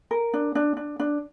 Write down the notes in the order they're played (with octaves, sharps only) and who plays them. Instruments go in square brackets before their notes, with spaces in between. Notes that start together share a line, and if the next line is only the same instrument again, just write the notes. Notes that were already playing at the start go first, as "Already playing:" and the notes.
[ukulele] A#4
D4
D4
D4
D4